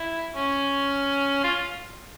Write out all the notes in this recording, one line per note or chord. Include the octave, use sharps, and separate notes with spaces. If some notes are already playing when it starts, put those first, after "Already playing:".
Already playing: E4
C#4
F4